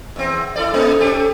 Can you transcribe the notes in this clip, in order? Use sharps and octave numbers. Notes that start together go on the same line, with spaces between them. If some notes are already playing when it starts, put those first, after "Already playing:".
E2 C4
E4 A4 D5
A#3 C#4 D#4
C#4 G4 A4